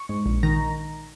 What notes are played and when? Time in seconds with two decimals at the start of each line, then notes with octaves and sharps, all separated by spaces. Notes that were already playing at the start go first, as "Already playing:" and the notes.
Already playing: C#6
0.09 G#2
0.26 A#1
0.43 D#3 A#5